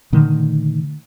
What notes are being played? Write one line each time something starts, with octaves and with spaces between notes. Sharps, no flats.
A#2 D3 D#3 A3